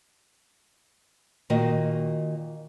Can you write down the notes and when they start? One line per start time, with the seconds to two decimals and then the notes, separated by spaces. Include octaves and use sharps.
1.50 A#2 D#3 F#4 D#5